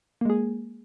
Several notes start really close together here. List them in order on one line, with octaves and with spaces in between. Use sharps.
A#3 G#3 G#4